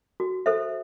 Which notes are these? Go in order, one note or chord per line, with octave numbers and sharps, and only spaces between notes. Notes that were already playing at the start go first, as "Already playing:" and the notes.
F#4
A4 C5 E5